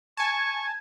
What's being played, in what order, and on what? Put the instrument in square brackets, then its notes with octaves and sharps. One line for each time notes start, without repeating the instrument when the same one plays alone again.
[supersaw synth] G#5 A5 [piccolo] C#6 [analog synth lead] G#6